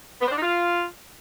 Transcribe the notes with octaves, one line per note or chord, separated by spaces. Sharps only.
B3
C5
D4
D#4
F4